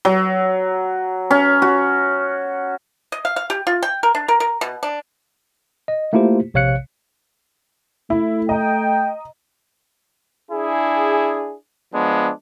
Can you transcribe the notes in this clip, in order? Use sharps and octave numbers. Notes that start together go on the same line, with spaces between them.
F#3
C#4
F#4
D#5
F5
F5
G4
F4
G5
A#4
D4
A#4
A#4
B2
D4
D#5
A3 A#3 E4 F4 G4 C5
A#1 C3 C#5 F5 F#6 C#7
A3 E4
D#5 G5 A#5
D4 E4 G#4
F3 G#3 B3 D4